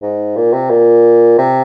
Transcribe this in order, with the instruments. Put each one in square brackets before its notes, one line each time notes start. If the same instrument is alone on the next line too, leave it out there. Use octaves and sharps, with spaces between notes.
[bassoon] G#2
A#2
C3
A#2
C3